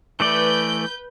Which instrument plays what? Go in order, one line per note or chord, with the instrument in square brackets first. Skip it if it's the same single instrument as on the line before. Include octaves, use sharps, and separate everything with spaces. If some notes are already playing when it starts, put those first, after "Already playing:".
[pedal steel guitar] E3 A3 D5 [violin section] B4 G6